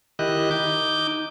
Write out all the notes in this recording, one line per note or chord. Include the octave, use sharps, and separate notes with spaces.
D#3 E4 G4 D#5 F#6
D#4 D6 G6